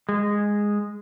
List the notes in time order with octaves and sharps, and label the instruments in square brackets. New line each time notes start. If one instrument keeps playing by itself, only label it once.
[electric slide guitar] G#3